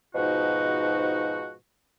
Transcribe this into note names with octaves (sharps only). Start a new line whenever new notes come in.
G#2 B2 F3 D#4 F#4